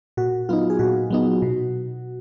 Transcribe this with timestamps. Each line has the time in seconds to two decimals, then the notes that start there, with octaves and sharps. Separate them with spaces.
0.17 A#2 F#4
0.49 F#3 B3 D#4 F4
0.70 G#4
0.79 A#2 F#4
1.11 F#3 B3 D#4
1.42 B2